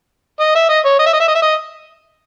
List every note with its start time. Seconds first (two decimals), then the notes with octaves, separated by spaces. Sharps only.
0.40 D#5
0.55 E5
0.69 D#5
0.85 C#5
0.99 D#5
1.06 E5
1.13 D#5
1.20 E5
1.28 D#5
1.35 E5
1.42 D#5